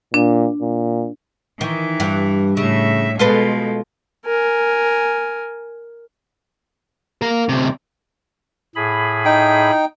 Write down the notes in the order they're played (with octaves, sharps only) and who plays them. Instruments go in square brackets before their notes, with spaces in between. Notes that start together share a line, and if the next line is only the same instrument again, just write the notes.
[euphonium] A#2 [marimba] D4
[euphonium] A#2
[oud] D#3 [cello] E3
[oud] G2
[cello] A2 E5 [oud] C#3
[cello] B2 G#3 [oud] F4 A4 B4
[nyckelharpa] A#4 G#5
[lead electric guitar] A#3 A#4
D2 C3
[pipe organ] A2 G#4 B5
[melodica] D#4 G5